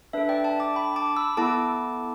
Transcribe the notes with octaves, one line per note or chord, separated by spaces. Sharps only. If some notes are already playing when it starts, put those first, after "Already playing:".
D4 A4 B4 E5
D5 G5
E5 A5
A5 D6
G5 B5
A5 D6
B5 E6
B3 E4 A4 A5 D6